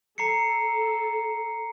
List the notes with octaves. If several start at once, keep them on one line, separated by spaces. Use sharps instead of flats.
A4 A#5 C7 C#7